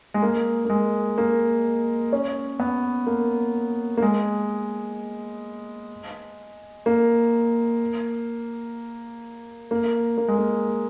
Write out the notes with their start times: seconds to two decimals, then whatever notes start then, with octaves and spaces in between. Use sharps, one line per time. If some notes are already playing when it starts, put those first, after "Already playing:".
0.14 G#3
0.22 A#3
0.65 A#3
0.70 G#3
1.18 A#3
2.13 C#4
2.60 B3
3.07 A#3
3.97 A#3
4.02 G#3
6.86 A#3
9.71 A#3
10.18 A#3
10.28 G#3
10.38 A#3